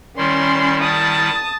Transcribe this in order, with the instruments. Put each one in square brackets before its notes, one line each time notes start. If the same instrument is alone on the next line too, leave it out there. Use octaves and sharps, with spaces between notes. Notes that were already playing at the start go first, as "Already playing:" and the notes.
[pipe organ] D#3 G3 E4 [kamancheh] C#4 C6
[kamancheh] A5 D#6